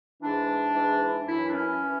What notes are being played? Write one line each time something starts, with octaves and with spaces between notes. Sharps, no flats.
G#2 E3 D4
G#2 E3
F#2 E3 E4
D4
C#4
E3